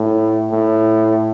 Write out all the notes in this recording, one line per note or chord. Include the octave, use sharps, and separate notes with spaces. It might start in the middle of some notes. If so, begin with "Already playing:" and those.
Already playing: A2
A2